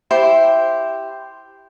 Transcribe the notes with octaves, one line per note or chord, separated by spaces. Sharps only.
E4 G4 C5 C6